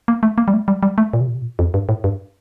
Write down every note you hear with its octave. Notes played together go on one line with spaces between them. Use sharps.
A#3
A3
A#3
G3
A3
G3
G3
A3
A#2
C3
A#2
C3
A#2
F2
G2
A2
G2